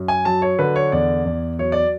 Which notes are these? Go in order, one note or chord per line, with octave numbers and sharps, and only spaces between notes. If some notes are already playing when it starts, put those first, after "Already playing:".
Already playing: F#2
G#5
F#3 A5
C#5
D3 B4
C#5
E2 D5
E2
F#3 C#5
D5